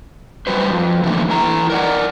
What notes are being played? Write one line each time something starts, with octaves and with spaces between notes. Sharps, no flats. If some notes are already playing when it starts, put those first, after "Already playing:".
F#3 G3 F#4 B4 C5
F2
D3 E3 F3 A3 A#3
E3 E4 A#5
A#4 D5 F#5